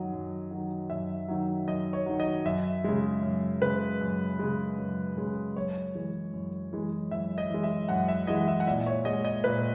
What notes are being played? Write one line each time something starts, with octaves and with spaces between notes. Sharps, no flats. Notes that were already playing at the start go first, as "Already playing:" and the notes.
Already playing: F#2 D#3 F#3 D#5
F#2
D#3 F#3
F#2 E5
D#3 F#3
F#2 D#5
C#5
D#3 F#3
D#5
F#2 E5
C#3 G#3
F#2
C#3 G#3 B4
F#2
C#3 G#3
F#2
C#3 G#3
F#2 C#5
E3 G#3
F#2
E3 G#3
F#2 E5
D#5
E3 G#3
E5
F#2 F#5
E5
E3 G#3 D#5
E5
F#5
A#2 E5
C#5
G#3 D#5
D#5
A#2 B4